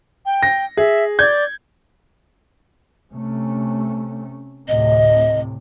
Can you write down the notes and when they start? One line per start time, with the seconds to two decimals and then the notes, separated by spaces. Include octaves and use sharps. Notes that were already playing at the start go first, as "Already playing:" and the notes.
0.26 G5
0.43 A#6
0.77 G#4 E5
1.19 D5 G6 G#6
3.11 C3 A3 C#4
4.68 D2 A2 C3 D#5